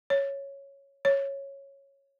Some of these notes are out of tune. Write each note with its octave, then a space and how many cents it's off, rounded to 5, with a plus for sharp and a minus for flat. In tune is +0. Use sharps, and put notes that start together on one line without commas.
C#5 +0
C#5 -5